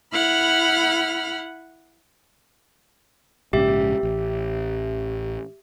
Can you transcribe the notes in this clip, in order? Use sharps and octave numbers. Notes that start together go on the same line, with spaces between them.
E4 F#5 B5 F6
A#1 G#2 C#3 G4 E5
A1